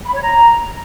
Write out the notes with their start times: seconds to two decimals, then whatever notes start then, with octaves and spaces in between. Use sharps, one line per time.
0.06 B5
0.13 C#5
0.21 A#5